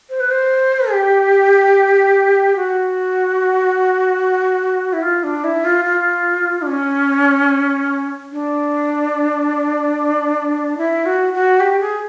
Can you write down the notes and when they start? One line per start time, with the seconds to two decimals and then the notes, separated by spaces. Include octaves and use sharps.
0.10 C5
0.20 B4
0.31 C5
0.91 G4
2.56 F#4
4.93 E4
5.03 F4
5.24 D4
5.44 E4
5.65 F4
5.85 F4
6.62 D4
6.67 C#4
8.32 D4
10.78 E4
11.06 F#4
11.34 F#4
11.60 G4
11.81 G#4